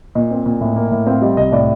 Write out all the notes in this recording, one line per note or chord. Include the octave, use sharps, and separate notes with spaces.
A#2 D#5
C4
A#2
A2
A#3
A2
C4 F5
G3 D#5
C2 D#5
A2 D5